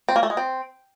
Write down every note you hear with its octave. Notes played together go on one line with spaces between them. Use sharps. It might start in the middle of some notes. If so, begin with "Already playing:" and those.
C4
A#3
A3
G#3
C4